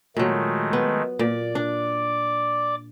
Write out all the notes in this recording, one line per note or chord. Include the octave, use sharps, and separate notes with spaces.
A#2 D#3 F#3 G#3 A3
B3
A#2 D5 D6
D4